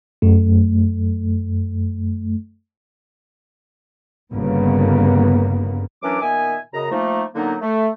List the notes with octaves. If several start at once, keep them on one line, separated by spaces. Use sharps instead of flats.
F#2 A3
G1 G2 C#3 A#3 B3
F#2 E3 F#3 C#4 D4 D6
A#2 D#3 B3 E5 G#5
F#2 C#3 D#5 A#5
F3 A3 A#3 D#4
A#2 D3 F#3 A#3 B3 D#4
A3